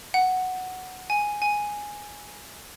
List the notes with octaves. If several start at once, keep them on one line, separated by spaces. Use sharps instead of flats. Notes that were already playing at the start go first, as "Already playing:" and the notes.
F#5
G#5
G#5